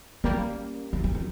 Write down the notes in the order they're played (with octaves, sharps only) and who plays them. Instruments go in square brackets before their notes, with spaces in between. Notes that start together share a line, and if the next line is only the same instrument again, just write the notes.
[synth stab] G3 A#3 [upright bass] C#4
[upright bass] C4
C#4
C4